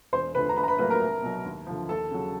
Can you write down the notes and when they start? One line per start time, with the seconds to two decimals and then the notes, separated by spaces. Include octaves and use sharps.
0.13 E1 C5 C6
0.35 D2 D3 B4 B5
0.49 A#5
0.56 A#1 B4 B5
0.63 A#5
0.68 B4 B5
0.78 A2 F#3 A#3 B4 B5
0.90 A#4 A#5
1.00 C2
1.22 B2 F#3
1.45 D#2
1.67 D3 F3
1.89 D#2 A4 A5
2.11 C#3 F#3